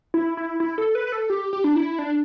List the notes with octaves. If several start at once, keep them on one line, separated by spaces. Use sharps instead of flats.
E4
E4
E4
A4
B4
B4
A4
G4
G4
D4
E4
D4